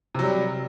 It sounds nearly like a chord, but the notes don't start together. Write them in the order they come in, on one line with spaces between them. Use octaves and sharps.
C3 F#3 G3